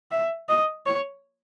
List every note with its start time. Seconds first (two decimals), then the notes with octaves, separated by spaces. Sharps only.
0.11 E5
0.49 D#5
0.86 C#5